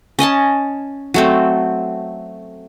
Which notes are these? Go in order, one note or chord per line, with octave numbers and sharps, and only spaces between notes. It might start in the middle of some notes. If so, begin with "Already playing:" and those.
C#4 D#5 G#5 A5
F#3 A3 C4